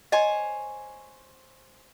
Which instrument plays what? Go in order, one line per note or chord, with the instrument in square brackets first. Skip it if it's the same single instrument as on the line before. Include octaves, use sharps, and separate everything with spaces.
[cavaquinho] C5 C#5 G#5 [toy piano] D#5